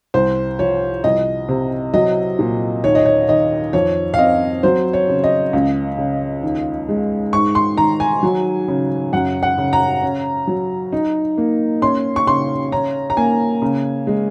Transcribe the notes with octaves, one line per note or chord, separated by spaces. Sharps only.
C2 C5
F3 C#5
C2 D#5
C3
F#3 D#5
A#2
D#2 C#5
D#5
C#5
D#3 D#5
F2 C#5
F5
C4 D#5
F#3 C5
C#5
C#3
D#5
C#2
C#3
D#2
G#3
G#2 C#6
C6
D#3 A#5
G#5
F#3
C#3
F#2 F#5
F#5
C#3
A#5
C#4
F#3
D#4
A#3
C#4 C6
C#6
C#3 C6
C#4 A#5
A#5
A#3 G#5
C#3
G#3